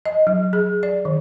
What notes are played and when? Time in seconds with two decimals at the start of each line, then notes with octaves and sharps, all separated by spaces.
0.06 D#5
0.27 F#3
0.53 G#4
0.83 D5
1.05 D#3